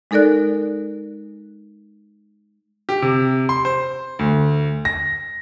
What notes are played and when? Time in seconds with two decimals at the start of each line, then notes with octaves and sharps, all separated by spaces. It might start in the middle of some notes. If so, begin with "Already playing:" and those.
0.11 G#3 D#4 A4 A#4 D5 F#6
2.89 G4
3.02 C3
3.49 C6
3.65 C5
4.19 D2
4.85 A#6